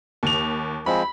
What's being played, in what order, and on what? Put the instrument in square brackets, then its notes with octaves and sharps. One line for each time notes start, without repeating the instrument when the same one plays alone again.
[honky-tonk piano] D#2 F7
[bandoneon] F3 G#3 C4 [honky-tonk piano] B5